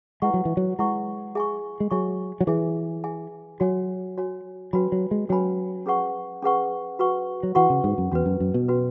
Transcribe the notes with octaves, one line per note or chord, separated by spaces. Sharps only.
G#3 E4 B4 F#5 C#6
F#3
E3
F#3
G#3 E4 B4 F#5 C#6
G#4 E5 G#5 C#6
G#3
F#3 G#4 E5 G#5 C#6
F#3
E3 G#4 E5 G#5
G#4 E5 G#5
F#3 F#4 C#5 G#5
F#4 C#5 G#5
F#3 C#4 F#4 B4 G#5 B5
F#3
G#3
F#3 C#4 F#4 B4 G#5 B5
C#4 G#4 B4 F#5 C#6
C#4 G#4 B4 F#5 C#6
F#4 B4 F#5 C#6
F#3
E3 F#4 B4 F#5 C#6
C#3
G#2
F#2
E2 C#4 F#4 B4
F#2
F#2
B2
C#4 F#4 B4